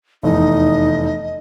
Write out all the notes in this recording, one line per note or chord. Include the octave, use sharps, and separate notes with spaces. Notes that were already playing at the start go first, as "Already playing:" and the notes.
F1 E2 D#4 D#5